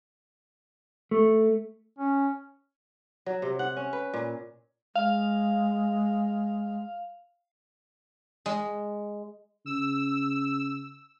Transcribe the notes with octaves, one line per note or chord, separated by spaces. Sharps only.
A3
C#4
F#3
C3
F#5
C#4
B4
A#2
G#3 F5
G#3
C#3 E6